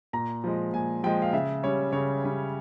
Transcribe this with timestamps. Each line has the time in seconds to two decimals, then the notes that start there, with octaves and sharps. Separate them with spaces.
0.13 A#2 A#5
0.44 F3 G#3
0.73 A#2 G#5
1.04 F3 G#3 G5
1.22 F5
1.33 C#3 E5
1.63 G3 C#4 C#5
1.92 C#3 C#5
2.23 G3 C#4